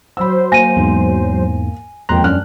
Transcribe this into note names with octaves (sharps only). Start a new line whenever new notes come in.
F#3 C5 B5 E6
A#3 G#5 A#6 D#7
E2 G#2
E1 F2 A#3 G5 A#5 C6 F#6
F#2 C#4 D4 F6 F#6